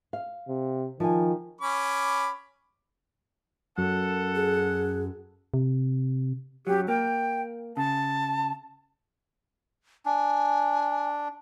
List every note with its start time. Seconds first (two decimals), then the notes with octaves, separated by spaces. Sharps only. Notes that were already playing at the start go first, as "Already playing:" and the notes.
0.13 F5
0.48 C3
1.00 D#3 F3 G#5
1.61 C#4 B5 D6
3.78 F#2 A4 F#5
4.35 G#4
5.54 C3
6.67 F#2 F#3 G4
6.88 A#3 G5
7.77 C#3 A5
10.06 D4 G#5